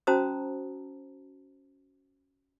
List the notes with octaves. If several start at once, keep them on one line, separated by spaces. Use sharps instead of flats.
C#4 F#4 C5 A5 A#5 D#6